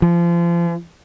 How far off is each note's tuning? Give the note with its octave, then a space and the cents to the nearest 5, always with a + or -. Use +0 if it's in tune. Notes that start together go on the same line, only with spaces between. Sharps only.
F3 -30